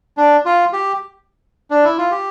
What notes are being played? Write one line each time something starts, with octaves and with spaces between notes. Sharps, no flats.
D4
F4
G4
D4
E4
F4
G4